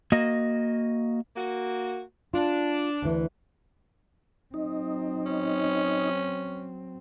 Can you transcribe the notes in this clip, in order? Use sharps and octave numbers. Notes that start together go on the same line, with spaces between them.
A#3 F#4 D#5
A#3 F#4
D4 F4
D2 E3
F#3 C4 D#4
C#4